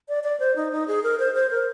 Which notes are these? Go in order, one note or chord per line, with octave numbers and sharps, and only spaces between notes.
D5
D5
C5
D#4
D#4
G#4
A#4
C5
C5
A#4